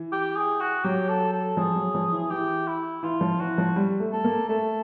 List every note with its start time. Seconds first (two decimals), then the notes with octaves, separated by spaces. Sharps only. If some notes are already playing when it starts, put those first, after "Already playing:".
Already playing: E3
0.12 G4
0.36 G#4
0.61 F#4
0.84 F#3 G4
1.09 A4
1.33 A4
1.57 F3 G#4
1.75 F#3
1.95 F3
2.12 E3
2.30 E3 G4
2.67 E4
3.03 E3 F4
3.21 F3
3.40 E3 F#4
3.58 F3
3.76 G3
4.00 A3
4.12 A3 A4
4.24 A#3
4.48 A3 A4